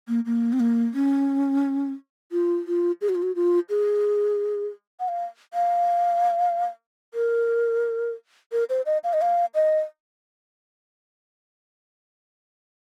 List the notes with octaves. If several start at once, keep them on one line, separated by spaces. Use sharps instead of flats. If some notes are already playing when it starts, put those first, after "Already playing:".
A#3
A#3
C4
A#3
C#4
F4
F4
G#4
F#4
F4
F#4
F4
G#4
F#5
F5
F5
A#4
A#4
C5
D#5
F5
D#5
F5
D#5